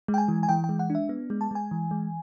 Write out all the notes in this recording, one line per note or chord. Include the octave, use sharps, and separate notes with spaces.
G#3
G5
G#5
E3
G#5
E3 G5
G5
G#3
F#5
D4
E5
B3
G#3
A5
G#3 G#5
E3
G#3